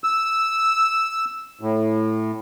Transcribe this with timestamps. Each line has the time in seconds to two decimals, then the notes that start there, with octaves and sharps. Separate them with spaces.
0.04 E6
1.61 A2